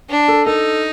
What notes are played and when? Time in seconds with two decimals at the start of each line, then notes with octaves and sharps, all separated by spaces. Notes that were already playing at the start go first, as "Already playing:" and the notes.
0.10 D4
0.28 A4
0.46 D#4 A4